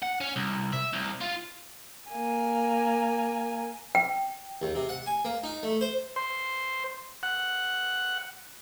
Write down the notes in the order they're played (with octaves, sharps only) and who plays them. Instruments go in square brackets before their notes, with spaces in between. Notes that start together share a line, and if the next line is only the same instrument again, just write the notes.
[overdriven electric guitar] F#5
C#4
C2
E5
C2
F4
[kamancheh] A#3 G#5
[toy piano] G5
[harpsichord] D#2
C3
F#5
G#5
A#3
D#4
A3
C5
[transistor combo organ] C5
F#5